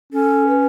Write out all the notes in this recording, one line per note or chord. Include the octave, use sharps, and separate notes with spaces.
C#4 A4
B4